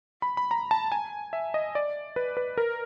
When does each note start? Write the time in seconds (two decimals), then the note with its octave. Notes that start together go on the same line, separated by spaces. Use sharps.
0.22 B5
0.37 B5
0.51 A#5
0.71 A5
0.92 G#5
1.33 E5
1.54 D#5
1.75 D5
2.16 B4
2.37 B4
2.58 A#4